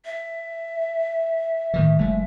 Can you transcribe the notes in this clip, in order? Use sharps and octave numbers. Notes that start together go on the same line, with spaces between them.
E5
A2 D#3 E3
F#1 G#3 A3